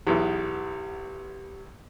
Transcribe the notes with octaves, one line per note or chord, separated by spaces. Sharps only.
B1 E2 G4